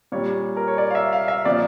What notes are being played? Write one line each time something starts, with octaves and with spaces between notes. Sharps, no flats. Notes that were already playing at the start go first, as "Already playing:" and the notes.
A#2 G3 C#5
A#4
C#5
D5
F5
E5
F5
E5
A#2 F3 D5